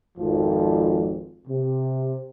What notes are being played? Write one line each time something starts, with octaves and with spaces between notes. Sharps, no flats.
G#1 F2 F3
C3